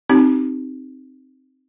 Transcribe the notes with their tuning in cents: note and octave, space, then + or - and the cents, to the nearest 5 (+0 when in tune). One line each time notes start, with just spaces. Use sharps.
C4 +0 D#4 -15 G4 -25